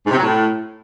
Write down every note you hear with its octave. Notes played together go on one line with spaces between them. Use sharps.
G#2
C3
F#3
A2